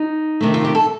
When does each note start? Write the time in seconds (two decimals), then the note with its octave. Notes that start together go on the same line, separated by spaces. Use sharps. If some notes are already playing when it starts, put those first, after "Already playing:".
Already playing: D#4
0.41 C3 D#3 A3
0.54 F4
0.65 G4
0.75 A4